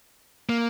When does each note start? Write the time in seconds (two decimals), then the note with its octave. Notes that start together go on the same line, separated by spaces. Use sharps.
0.49 A#3